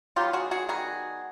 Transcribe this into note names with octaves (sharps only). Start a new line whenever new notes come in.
D#3 F#3 B3 F4 G4
F#4 G#4
F#4 G#4
D#3 G3 B3 F#4 G#4